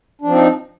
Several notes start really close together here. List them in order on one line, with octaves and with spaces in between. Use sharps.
D4 F3 C4 D#4